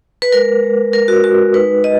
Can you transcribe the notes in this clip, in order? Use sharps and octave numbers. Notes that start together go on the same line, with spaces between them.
B4
G#3 A#4
G#3
G#3 A#4
F#4
G#3 F#4
D#4 B4
G#3 D#5